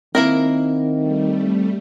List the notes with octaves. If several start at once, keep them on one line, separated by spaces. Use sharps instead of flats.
D#3 A#3 C4 E4 A#4
G3 A3